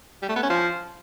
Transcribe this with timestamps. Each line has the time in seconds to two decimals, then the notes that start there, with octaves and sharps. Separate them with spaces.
0.22 G3
0.29 A3
0.36 B3
0.43 C#4
0.50 F3